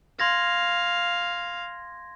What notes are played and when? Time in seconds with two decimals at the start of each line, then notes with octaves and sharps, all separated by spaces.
0.20 F5 C6 G#6 A#6